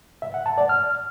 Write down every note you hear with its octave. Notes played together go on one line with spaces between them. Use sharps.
E5
F#5
A5
D5
F6